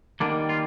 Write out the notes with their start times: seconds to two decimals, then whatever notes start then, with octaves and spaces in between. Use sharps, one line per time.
0.20 D3 D#3 G3 A#3 D4
0.49 F4